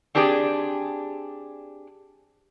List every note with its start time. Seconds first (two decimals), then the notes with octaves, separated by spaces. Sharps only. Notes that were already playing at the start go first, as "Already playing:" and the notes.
0.15 C4 D4 G4 G#4 B4 D5